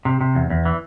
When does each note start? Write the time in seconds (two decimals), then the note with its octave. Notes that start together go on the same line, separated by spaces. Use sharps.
0.05 C3
0.21 C3
0.35 E2
0.50 E2
0.65 E3